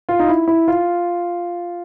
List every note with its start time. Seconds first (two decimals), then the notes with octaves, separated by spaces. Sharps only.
0.09 F4
0.19 D#4
0.29 E4
0.48 E4
0.68 F4